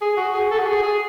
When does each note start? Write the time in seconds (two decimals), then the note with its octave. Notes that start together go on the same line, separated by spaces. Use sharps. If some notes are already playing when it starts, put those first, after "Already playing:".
0.01 G#4
0.17 F#4
0.34 G#4
0.51 A4
0.58 F#4
0.66 G#4
0.83 G#4